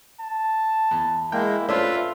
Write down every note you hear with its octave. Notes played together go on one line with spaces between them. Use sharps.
A5
E2
G#3 A#3 E4 G#4 G5
A3 C#4 D4 F4 B4 C5 E5 E6